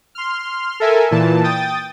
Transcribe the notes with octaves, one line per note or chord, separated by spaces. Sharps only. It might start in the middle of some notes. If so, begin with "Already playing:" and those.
C6 F6
A4 A#4 E5 G#5
A#2 E3 A5
G5 D#6 A6